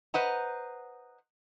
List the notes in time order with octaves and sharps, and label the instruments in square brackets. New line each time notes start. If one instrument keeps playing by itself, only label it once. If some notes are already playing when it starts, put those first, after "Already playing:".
[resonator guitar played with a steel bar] B4 C5 D#5 F#5 A#5